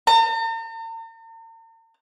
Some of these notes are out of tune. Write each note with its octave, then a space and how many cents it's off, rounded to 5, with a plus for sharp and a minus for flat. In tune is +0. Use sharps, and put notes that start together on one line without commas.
A#5 -45